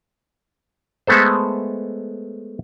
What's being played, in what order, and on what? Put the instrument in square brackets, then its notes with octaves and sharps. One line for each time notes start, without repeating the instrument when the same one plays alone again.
[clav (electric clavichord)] G#3 A3 B3 A4 C5